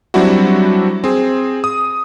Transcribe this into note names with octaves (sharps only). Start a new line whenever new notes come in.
F#3 G3 C4 D4 E4 F#4
C4 G#4
D#6